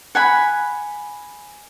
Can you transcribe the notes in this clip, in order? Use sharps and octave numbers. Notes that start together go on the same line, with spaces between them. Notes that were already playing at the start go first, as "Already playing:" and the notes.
F#5 G#5 B5